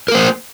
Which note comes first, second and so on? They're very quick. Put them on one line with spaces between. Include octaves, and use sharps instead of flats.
A#4 A#3 C5